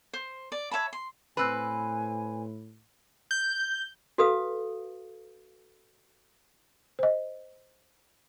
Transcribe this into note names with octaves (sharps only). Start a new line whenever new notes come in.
C5
D5
C#5 E5 A5 B5
C6
A2 C4 B4 G#5 B5 E6 F#6
G6
F#4 A4 B4 F5 D#6
C5 D#5